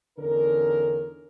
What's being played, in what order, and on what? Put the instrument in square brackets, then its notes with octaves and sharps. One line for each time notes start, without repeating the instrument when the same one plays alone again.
[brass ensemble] E2 D3 C#4 D#4 A#4